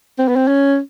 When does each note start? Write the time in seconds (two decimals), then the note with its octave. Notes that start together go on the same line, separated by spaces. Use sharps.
0.19 C4
0.28 B3
0.36 C4
0.48 C#4